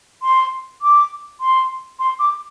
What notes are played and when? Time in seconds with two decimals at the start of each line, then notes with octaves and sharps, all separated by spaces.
0.23 C6
0.82 D6
1.41 C6
1.99 C6
2.19 D6